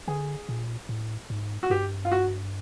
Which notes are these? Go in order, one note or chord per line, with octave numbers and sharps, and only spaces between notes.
D3 G#4
A#2
A2
G#2
F#4
G2 G4
F4
F#4